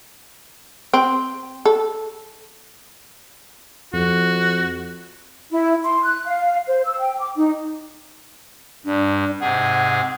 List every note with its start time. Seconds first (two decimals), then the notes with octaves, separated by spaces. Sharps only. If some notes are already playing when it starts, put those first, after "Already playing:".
0.93 C4
1.65 A4
3.93 F2 F#4
5.51 E4
5.84 C6
6.03 F#6
6.26 F5
6.67 C5
6.85 E6
6.99 G5
7.20 D6
7.36 D#4
8.85 G2 D4
9.40 G#2 C3 G#4 F#5